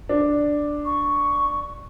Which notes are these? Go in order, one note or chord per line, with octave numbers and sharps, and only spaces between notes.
D4
C#6